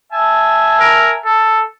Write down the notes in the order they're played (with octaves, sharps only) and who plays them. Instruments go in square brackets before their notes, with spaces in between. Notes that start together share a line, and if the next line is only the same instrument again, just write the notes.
[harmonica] E5 G#5 A5
[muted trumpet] A#4
A4